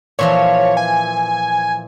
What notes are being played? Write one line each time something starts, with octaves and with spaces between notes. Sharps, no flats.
A#2 E3 F3 C#5
G#5